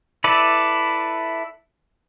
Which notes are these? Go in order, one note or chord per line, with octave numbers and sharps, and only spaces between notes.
E4 A4 B4 D5